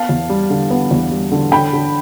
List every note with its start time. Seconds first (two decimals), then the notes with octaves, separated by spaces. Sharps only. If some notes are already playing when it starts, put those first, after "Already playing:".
Already playing: B3 F5 A5
0.09 E2
0.29 G3
0.50 D3
0.70 B3
0.91 E2
1.11 G3
1.32 D3
1.52 D3 G5 B5
1.73 D3